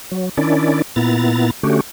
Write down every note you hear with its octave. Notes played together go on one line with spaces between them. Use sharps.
F#3
D#3 C#4 D4 E4 D5
A#2 B3 E4 A#5 A6
D3 A3 C#4 F#4 G4